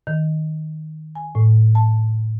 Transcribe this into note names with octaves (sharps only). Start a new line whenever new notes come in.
D#3
G#5
A2
A5